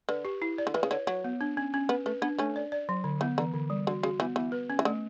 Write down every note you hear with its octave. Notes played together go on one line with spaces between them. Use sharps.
D3 B4
G4
E4
D5
D3
E3 B4
C#3
D3 C#5
F#3 C#5
B3
D4
C#4
C#4
B3 B4
A3 B4
B3 D4
A3 C#4 D4
D5
D5
F#3
D3
E3 B3
D3 E3
D3
G3
D3 F#4
C#3 F#4
E3 B3
E3 B3
B4
C#4
E3
D3 A3